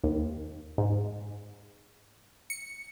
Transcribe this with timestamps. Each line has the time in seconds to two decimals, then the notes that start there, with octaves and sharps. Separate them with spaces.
0.04 D#2
0.78 G#2
2.50 C#7